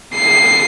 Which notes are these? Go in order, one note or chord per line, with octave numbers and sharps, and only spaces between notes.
C7